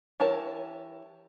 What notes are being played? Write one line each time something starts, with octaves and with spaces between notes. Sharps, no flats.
E3 G4 A#4 C#5 A5